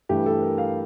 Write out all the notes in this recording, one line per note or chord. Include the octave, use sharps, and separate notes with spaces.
G2 E3 A3 G4
A4
A#4
F5